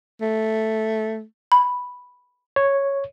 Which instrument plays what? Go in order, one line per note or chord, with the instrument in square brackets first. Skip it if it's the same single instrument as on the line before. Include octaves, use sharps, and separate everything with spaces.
[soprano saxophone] A3
[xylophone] B5
[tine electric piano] C#5